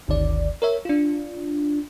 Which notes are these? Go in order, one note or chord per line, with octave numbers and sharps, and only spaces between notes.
G1 D2 D#3 D5
A#4 C#5 E5
D4 F4